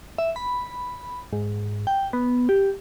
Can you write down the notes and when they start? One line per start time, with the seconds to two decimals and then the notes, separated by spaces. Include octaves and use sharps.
0.18 E5
0.36 B5
1.33 G#2
1.87 G5
2.13 B3
2.49 G4